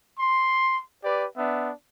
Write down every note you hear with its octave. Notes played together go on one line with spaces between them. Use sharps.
C6
G4 B4 D5
B3 D4 E5